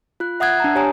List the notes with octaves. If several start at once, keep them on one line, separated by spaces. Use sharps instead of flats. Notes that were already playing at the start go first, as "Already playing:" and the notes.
F4 F#6
E5 F#5 D#6 F#6 G#6
D4 A5 A#5
G4 C#5 G#5 A#5 D#6